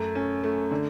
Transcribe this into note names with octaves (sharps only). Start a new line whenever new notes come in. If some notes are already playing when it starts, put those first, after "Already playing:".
Already playing: F#2 A3
C#4
A3
D3